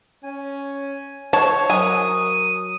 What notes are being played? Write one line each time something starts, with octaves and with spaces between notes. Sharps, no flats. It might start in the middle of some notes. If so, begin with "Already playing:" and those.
C#4 G#5
C5 C#5 A5
F#3 A#4 G#5 D#6